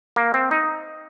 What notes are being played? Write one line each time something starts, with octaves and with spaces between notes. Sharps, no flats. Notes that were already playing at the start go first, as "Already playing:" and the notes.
A#3
C4
D#4